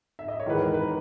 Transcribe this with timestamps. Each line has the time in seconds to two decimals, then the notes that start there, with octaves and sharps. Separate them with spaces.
0.19 E5
0.28 D#5
0.40 C#5
0.46 E2 D#3 G#3 B4
0.60 A#4
0.74 B4